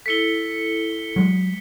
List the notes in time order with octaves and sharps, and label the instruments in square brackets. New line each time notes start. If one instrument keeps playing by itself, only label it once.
[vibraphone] E4 A4 [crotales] B6 C#7 G7
[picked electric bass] F#3 G#3